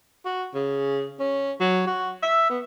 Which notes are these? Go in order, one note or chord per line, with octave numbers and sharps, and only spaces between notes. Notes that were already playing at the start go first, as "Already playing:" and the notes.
F#4
C#3
C#4
F#3
F#4
E5
B3